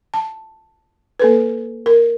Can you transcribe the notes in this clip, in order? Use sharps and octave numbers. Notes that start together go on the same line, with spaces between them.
A5
A#3 A4 B4
A#4